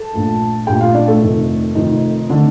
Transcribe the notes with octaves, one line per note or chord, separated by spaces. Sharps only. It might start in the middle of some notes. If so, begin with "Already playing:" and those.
Already playing: A4 A5
A#1 A#2 A3
A#1 A#2 A3 G4 G5
F4 F5
D4 D5
A3 A4
F1 F2 D#3 A3
F1 F2 D#3 A3 D#4
D3 D#3 A3 D4